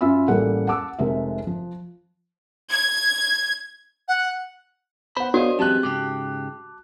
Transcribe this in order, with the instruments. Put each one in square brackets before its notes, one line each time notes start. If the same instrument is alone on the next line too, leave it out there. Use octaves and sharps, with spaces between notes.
[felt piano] F#2 C#4 F4 E5 B5 E6
A1 G3 A#3 G#4 A4 F#5
F#5 A5 D6 E6
F1 C3 G#3 A#4 E5
F3
[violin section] G#6
[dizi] F#5
[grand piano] B3 F#5 [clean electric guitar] C5 B5
[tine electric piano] B3 C#5 F5 [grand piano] D4 [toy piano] F#4 [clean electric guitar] A#4 C5 D#5
[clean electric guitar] F#2 E3 G#3 [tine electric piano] C4 G4 [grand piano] A5 F#6
[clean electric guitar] G#2 C#3 G4 [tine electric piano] D6